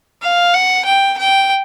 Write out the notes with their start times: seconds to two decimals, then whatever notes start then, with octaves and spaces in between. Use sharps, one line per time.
0.22 F5
0.54 F#5
0.85 G5
1.18 G5